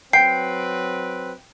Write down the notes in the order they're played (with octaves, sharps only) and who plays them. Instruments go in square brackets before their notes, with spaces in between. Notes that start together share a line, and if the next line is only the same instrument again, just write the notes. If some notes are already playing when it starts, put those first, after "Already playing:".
[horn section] F#3 C4 B4 [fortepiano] G5 [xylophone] C7